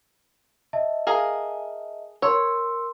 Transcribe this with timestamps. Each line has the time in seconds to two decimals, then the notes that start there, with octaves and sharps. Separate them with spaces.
0.73 D#5 E5 A5
1.07 G#4 A#4 F5
2.22 A#4 C#5 C6 E6